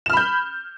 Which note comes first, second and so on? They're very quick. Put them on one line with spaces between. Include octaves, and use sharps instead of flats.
E7 F6 B5 G6